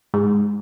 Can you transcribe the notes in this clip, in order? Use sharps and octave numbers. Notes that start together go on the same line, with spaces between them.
G#2